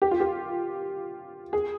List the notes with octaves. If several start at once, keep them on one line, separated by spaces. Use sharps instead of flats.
G4
F4
G4
G#4